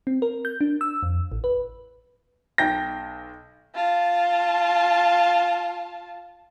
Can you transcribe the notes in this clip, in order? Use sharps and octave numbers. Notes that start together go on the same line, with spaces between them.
C4
A#4
G6
D4
E6
F2
A1
B4
B1 G5 G6 A#6
F4 A5